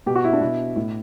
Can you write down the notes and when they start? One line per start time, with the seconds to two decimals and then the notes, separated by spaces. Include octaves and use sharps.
0.06 B2 G4
0.15 F#4
0.24 E4
0.33 D4
0.41 B2 E4
0.76 A2